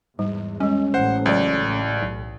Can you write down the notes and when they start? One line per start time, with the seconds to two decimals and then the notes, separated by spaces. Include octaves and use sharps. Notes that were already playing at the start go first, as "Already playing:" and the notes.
0.19 E2 G#2 G3
0.60 G3 G#3 C#4
0.94 A1 A2 C5 F#5
1.26 C#2 F#3 D5
2.02 B1